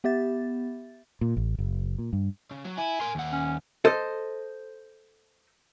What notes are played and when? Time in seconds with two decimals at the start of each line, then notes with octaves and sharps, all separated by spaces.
0.04 B3 G4 E5 A6
1.21 A#2
1.37 A1
1.58 F#1
1.99 A#2
2.13 G2
2.51 C#3
2.65 F#3
2.78 E4 G#5
3.01 A#4 C6
3.15 D#2 F#5
3.32 C#4
3.85 A4 C5 D#5